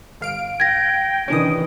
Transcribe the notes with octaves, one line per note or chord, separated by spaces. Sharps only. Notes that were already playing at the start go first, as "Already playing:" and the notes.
G1 F5 D7
G5 G#6 A#6
C3 D#3 E3 C#4 D4 D#6 D7